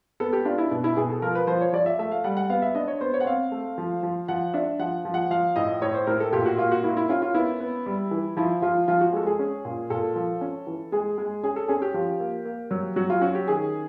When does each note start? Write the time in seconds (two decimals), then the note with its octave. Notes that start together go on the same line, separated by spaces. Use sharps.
0.20 B3 A4
0.33 G4
0.45 D4 F4
0.58 E4
0.71 B2
0.84 E4
0.97 B2 G#4
1.10 A4
1.22 F3 A#4
1.35 B4
1.47 F3 C5
1.61 C#5
1.73 F3 D5
1.86 E5
1.99 A3 E5
2.11 F5
2.24 G3 F#5
2.37 F#5
2.50 B3 F5
2.62 E5
2.75 D4 D#5
2.88 C#5
3.01 B3 C5
3.14 C#5
3.20 F#5
3.26 C4 F5
3.52 A3
3.78 F3
4.03 F3
4.28 F3 F#5
4.54 D4 E5
4.79 F3 F#5
5.05 F3
5.14 F#5
5.31 F3 F5
5.56 A2 D#5
5.82 A2 C#5
5.94 C5
6.07 A2 A#4
6.20 A4
6.33 A#2 G4
6.46 F#4
6.58 A#3 F4
6.71 F#4
6.84 A#3 E4
6.97 E4
7.09 C#4 F4
7.22 F4
7.34 B3 E4
7.60 B3
7.86 G3
8.11 E3
8.37 F3 E4
8.62 F3 F4
8.88 F3 F4
9.01 F#4
9.13 G#3 A4
9.26 G#4
9.39 C#4
9.65 A#2
9.90 A#2 A4
10.16 F3
10.41 C#4
10.67 E3
10.92 G#3 G#4
11.18 G#3
11.43 C#4 G#4
11.56 A4
11.68 C#4 G#4
11.82 G4
11.94 F3 G4
12.20 A#3
12.45 A#3
12.71 F#3
12.96 F#3 F#4
13.10 F4
13.21 C#4 F#4
13.35 G4
13.48 D#3 G#4